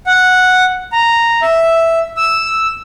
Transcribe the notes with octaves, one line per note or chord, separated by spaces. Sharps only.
F#5
A#5
E5
E6